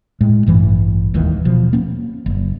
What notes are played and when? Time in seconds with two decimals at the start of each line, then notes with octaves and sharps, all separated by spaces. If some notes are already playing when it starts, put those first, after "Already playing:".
0.21 A2 G#3
0.47 A1 G2 E3 A3
1.14 E1 D#2 D#3 E3
1.45 B2 F3
1.73 A#3 C#4
2.26 F#1